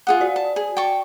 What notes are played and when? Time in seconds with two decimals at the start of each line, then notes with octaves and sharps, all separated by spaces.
0.07 F4 G#4 F#5
0.20 F#4 D5
0.36 A5
0.56 G#4
0.77 G5 A5 C#6